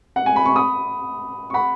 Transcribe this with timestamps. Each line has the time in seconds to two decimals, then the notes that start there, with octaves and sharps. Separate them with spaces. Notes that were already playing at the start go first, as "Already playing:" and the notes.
0.16 F#5
0.26 G#5
0.36 B5
0.46 C#6
0.56 B5 D#6
1.50 C#6
1.54 F#5 B5